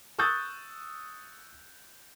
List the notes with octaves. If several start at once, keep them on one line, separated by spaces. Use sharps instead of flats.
C#6 D#6 E6 F#6 G6 A6